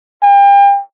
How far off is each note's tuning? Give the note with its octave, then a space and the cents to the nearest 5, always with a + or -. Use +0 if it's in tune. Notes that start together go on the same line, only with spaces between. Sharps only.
G5 +35